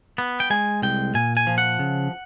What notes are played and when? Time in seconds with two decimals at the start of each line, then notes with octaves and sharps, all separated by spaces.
0.18 B3
0.40 G5
0.50 G#3 G#5
0.82 C2 G5
1.14 A#2 G#5
1.37 G#5
1.47 F3
1.58 F#5
1.79 C#3